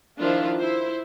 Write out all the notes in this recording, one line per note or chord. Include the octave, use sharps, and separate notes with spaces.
D#3 F3 D4 E4 F4
E4 C5